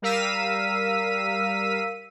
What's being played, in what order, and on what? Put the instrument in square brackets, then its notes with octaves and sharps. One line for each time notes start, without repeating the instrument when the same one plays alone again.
[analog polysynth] G3 A#4 F5 E6 B6 D#7